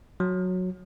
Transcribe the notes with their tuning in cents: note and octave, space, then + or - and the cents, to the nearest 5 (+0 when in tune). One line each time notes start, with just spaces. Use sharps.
F#3 -10